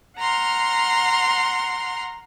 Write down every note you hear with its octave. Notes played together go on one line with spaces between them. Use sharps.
F#5 A#5 C6 F6